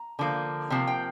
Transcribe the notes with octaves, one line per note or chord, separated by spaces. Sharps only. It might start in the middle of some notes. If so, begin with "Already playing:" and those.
Already playing: A#5
D3 F3 A#3
C3 F3 A#3
G5